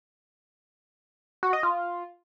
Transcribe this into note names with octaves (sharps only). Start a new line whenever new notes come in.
F#4
D#5
F4